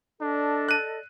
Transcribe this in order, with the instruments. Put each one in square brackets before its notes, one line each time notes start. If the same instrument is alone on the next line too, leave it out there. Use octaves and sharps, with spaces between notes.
[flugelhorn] D4 [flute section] A4 D5 D#5
[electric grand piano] F#6 D#7